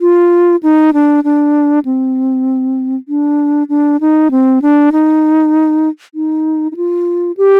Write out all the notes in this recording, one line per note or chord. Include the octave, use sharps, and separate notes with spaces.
F4
D#4
D4
D4
C4
D4
D4
D#4
C4
D4
D#4
D#4
D#4
F4
G4